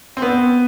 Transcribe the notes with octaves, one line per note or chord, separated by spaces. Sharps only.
C4
B3